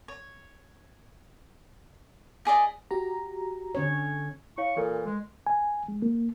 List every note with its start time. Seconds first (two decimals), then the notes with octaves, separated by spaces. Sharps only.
0.08 C#5
2.45 E4 G#4 D5 D#5
2.91 F#4 G4 A#5
3.75 D3 C#4 C#5
4.58 E4 C#5 F5 C#6
4.77 A#2 E3 A4
5.06 G#3
5.47 G#5
5.88 G#3
6.02 A#3